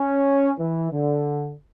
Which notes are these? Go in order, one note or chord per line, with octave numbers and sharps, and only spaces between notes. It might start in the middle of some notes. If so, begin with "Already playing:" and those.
Already playing: C#4
E3
D3